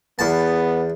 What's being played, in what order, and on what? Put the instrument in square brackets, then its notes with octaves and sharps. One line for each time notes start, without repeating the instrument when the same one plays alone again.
[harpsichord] E2 A5 [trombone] B3